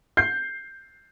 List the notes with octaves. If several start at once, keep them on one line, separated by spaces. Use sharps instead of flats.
G6 C7